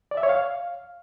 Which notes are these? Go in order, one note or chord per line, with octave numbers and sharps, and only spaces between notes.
D5
E5
C#5
F5